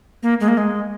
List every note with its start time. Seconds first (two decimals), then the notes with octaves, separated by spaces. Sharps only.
0.23 A#3
0.40 G#3
0.48 A#3
0.57 G#3